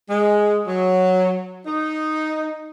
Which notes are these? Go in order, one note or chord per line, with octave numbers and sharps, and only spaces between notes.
G#3
F#3
D#4